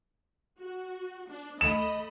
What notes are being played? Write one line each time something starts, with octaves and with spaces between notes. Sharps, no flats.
F#4
D4
A3 D#5 B5 E7